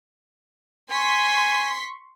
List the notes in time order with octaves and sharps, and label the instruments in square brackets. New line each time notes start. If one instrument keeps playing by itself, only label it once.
[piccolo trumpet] G#5 [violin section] C6 C#6 B6